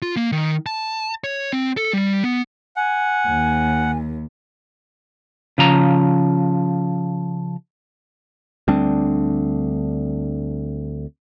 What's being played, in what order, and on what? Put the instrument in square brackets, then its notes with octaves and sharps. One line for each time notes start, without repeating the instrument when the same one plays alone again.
[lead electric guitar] F4
A#3
D#3
A5
C#5
C4
A4
G3
B3
[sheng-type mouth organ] F#5 [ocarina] G#5
[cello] D#2
[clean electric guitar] C#3 F3 A#5
[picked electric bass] D2 G3 C4 D4